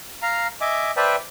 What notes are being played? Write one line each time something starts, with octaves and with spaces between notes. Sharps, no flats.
F5 A#5
D#5 E5 G#5 D6
B4 C5 D5 E5 G5 A5